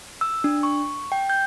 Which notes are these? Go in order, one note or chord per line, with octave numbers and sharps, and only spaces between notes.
E6
D4
C#6
G5
G6